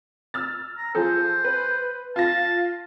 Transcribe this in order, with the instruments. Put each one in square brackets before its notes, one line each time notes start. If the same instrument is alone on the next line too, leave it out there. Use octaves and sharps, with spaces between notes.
[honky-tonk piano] E6 F6 A6
[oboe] A#5
[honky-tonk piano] F3 G#4 A4 [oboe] C5
[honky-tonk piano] B4
[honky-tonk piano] F4 A#6 [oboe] A5